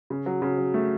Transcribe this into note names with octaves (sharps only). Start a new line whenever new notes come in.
C#3
F#3
C#3
F#3
A3